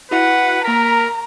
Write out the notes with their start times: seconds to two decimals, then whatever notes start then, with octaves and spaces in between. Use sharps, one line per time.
0.11 E4 F#4 B4 F#5
0.64 A#3 A#4 A#5 B6